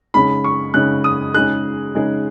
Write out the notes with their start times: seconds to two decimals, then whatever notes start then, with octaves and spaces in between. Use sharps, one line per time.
0.14 C#3 G#3 D#4 B5
0.44 C#6
0.74 C#3 G#3 D#4 F#6
1.04 D#6
1.34 C#3 G#3 D#4 G#4 F#6
1.95 C#3 G#3 D#4 G#4